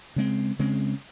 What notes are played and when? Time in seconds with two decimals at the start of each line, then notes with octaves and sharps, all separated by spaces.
0.16 C#3 G#3 C4
0.59 C#3 G#3 C4